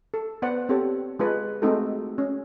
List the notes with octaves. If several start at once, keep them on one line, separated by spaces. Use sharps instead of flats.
A4
B3 B4 C5 D5 F#5
C4 G4 A4 C#5
G#3 F4 B4
G#3 A3 C4 D#4 F#4 A4
C#4